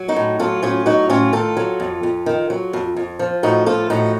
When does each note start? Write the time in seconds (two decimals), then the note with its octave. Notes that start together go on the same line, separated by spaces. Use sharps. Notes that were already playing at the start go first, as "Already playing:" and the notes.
Already playing: F#3
0.08 D#4 F#4
0.16 A2
0.39 F#3 F4 A4
0.62 A2 C#4 F4
0.86 F#3 D#4 F#4
1.09 A2 C#4 F4
1.33 D#3 F4 A4
1.57 F#3
1.80 F2
2.03 F2
2.26 D#3
2.50 F#3
2.73 F2
2.96 F2
3.19 F3
3.43 A2 D#4 F#4
3.66 F3 F4 A4
3.90 A2 D#4 F#4